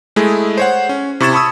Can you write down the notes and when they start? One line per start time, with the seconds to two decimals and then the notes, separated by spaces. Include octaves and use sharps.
0.16 G#3 A3 E4 G#4
0.58 C5 C#5 F#5
0.89 C#4
1.20 C3 E4 C#6 G#6 A6 E7
1.33 A5 B5 C#6 D#6 E6 G#6